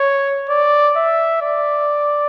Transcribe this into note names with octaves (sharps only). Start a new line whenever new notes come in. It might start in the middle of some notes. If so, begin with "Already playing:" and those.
Already playing: C#5
D5
E5
D5